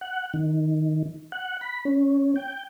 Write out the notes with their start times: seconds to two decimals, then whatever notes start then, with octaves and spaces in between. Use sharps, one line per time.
0.01 F#5
0.34 D#3
1.32 F#5
1.61 B5
1.85 C#4
2.36 G5